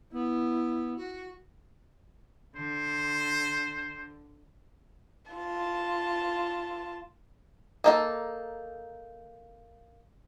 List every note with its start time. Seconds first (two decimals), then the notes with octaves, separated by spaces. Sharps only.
0.14 B3 E4
0.97 F#4
2.57 D3 C5
5.32 F4 A5
7.84 A#3 D#4 A4